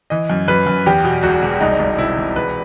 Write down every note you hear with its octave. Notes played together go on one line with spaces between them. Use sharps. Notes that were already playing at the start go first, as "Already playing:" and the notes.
E3 D#5
F#2
F#2 B4
F#2
E2 G4
B2
E1 F#4
E1
C2 D#4
C2
C3 E4
C3
E1 B4